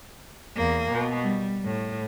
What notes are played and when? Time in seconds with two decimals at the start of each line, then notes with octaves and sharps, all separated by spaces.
0.56 E2 A#3
0.91 B2
1.22 G3
1.64 A2